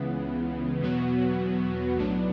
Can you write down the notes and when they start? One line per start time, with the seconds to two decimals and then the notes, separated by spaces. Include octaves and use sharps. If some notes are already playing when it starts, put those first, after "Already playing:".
Already playing: C#2 C#3 E3 B3
0.81 E2 B2 F#3 B3 F#4
1.97 B1 A2 F#3 B3 D4